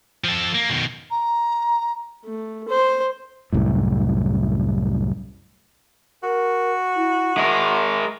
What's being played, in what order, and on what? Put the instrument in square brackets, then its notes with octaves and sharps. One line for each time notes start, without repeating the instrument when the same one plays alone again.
[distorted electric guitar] F3 A4
A#3
B2 D#3
[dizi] A#5
[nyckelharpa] A3
C5
[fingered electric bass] C2 F#2 A2
[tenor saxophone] F#4 [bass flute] A#4
[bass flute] E4
[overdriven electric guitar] G#3 A#4 [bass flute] E5